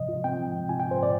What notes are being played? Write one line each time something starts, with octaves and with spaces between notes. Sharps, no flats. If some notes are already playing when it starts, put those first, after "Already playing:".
Already playing: C3 F3 D#5
F4
C4 G5
F3
C3
F4 G#5
C4 G5
C5
F3 D5